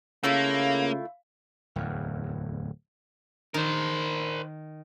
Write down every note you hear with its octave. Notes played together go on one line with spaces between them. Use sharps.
C#3 A3 A#3 E4 F4 F5
D1 E2
D#3 A#4 C5